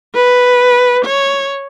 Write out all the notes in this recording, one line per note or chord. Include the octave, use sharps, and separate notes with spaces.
B4
C#5